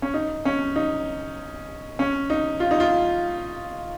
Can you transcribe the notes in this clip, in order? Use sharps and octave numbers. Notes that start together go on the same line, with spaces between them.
C#4
D#4
C#4
D#4
C#4
D#4
F4
D#4
F4